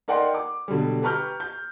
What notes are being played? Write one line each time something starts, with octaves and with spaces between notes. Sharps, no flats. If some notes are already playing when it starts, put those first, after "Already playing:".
D#4 A#4 D5 F#5 G5 C6
D6
B2 D3 F#3 G3
G4 B4 A#5 C#6 F6 G6
G6